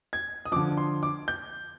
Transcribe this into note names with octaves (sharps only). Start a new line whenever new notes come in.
G#6
D#6
D3 F3 D6
C6
D6
G6